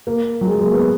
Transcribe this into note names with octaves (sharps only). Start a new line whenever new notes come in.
A#3
F#3
G#3
A#3
B3